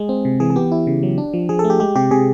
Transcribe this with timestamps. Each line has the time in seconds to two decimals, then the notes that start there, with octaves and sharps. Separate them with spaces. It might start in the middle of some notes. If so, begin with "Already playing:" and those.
Already playing: G#3 G#4
0.09 C4
0.25 C3
0.40 E3 G#4
0.50 G#4
0.56 B3 G4
0.72 E4
0.87 C#3
1.03 F#3
1.18 D4
1.34 F3
1.49 F3 G#4
1.59 A4
1.64 A3
1.70 G4
1.80 G#3 G4
1.95 C3 G4
2.11 C3 G#4